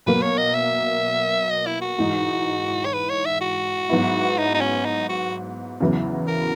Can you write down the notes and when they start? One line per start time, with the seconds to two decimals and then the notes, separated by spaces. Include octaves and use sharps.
0.06 B2 F#3 A#3 B4
0.22 C#5
0.38 D#5
0.54 E5
1.50 D#5
1.66 E4
1.81 F#4
1.98 G#2 E3 G#3 D#4
2.85 C#5
2.93 B4
3.10 C#5
3.25 E5
3.41 F#4
3.89 G#2 F#3 B3 E4
4.38 D#4
4.54 D#4
4.61 C#4
4.85 D#4
5.09 F#4
5.81 E2 C#3 F#3 B3 E4
6.28 A#4